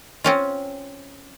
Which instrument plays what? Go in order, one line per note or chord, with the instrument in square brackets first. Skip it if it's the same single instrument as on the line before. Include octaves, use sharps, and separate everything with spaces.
[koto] C4 C#4 F4